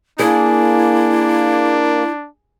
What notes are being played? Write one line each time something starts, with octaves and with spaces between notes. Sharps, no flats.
A#3 D4 E4 G#4